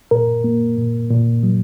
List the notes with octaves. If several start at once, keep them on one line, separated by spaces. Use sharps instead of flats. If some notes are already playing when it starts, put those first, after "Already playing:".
A#2 A#4
A#3
A#2
A#2
F#3